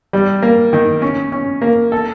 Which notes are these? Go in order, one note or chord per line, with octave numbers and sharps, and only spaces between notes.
G3
A#3
D#3
C#4
C#4
A#3
A4